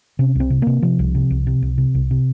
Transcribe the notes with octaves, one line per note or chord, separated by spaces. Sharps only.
C3 C#4
C2 C4
C3
C3 A#3
C3 F3
C2
C3
C2
C3
C2
C3
C2
C3